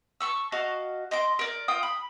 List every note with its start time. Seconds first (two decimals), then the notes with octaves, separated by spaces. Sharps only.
0.21 A5 B5 C#6 E6
0.52 F#4 D#5 F5 A5
1.11 D#5 C6 D6
1.39 A#4 D5
1.68 F4 G5 D#6
1.83 B5